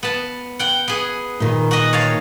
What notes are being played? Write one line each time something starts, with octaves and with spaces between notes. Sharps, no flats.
B3 A5
F#5 G5
B3 G#4
A#2 D#3
F#4 D#5
C#5 F5 A5